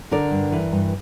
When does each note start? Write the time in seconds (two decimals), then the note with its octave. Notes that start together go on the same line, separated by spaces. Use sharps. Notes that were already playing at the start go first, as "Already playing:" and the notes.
0.11 D3 A#4 D5
0.31 G2
0.52 E3
0.72 G2